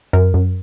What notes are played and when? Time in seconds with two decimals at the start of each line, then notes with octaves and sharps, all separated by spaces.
0.13 F#2 A#4
0.34 F#2